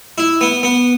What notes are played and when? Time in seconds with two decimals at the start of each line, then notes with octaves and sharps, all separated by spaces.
0.18 E4
0.41 B3
0.63 B3